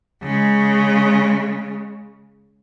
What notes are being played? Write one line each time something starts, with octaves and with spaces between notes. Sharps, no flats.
C#3 G#3